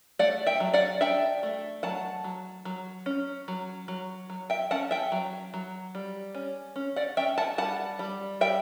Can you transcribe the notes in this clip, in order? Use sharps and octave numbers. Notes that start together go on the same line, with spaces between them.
A3 D5 F#5
E5 G5
F#3
D5 F#5
D4 E5 G5
A3
F#3 F#5 A5
F#3
F#3
C#4
F#3
F#3
F#3
E5 G5
C#4 F#5 A5
E5 G5
F#3
F#3
G3
C#4
C#4
D5 F#5
C#4 E5 G5
F#5 A5
G3 F#5 A5
G3
G3 E5 G5